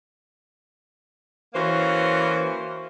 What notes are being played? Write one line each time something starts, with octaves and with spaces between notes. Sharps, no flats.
E3 A#3 C#4 F#4 C5